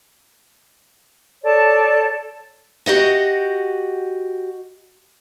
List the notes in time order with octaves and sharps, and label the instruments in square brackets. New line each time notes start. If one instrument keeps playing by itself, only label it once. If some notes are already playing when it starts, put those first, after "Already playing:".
[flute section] A4 C#5 D5 A5
[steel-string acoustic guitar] F#4 G4 D#5 F#5